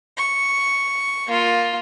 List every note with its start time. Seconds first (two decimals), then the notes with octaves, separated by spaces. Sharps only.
0.17 C#6
1.27 A#3 F4